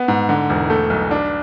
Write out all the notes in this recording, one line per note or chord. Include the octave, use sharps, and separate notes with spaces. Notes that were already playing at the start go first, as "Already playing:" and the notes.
Already playing: B3
G#2
D3
E1
A3
B1
D4